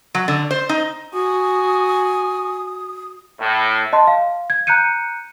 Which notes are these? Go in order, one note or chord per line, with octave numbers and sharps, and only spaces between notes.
F#3
D3
C5
D#4
F#4 G#5 D#6
A2
D#5 A5 C6
F5
G#6
A#5 F#6 G6 C#7 D#7